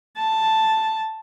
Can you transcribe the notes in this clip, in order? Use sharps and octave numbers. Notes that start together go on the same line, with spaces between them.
A5